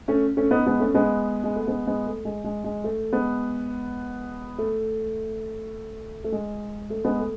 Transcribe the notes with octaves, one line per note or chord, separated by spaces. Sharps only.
A3 C#4
A3 C#4
B3 D#4
G#3 B3
A3 C#4
G#3 B3
G#3
A3
G#3 B3
G#3 B3
A3
G#3
G#3
G#3
A3
G#3 B3
A3
A3
G#3
A3
G#3 B3
A3